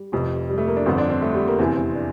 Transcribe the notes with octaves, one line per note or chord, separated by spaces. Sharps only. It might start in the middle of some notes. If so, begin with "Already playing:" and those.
Already playing: G3
F1 F2 C3
G3
A3
A#3
D4
G1 F2 D3 C4
D4
C4
A3
G3
A#3
F1 E2 C3 E3 C4
C4
D4